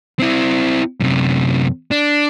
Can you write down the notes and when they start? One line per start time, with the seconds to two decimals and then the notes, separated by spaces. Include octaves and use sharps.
0.19 C4 E4
1.00 F#2 C3
1.91 D4